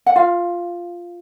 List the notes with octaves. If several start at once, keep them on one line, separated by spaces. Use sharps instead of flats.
F#5
F4 F5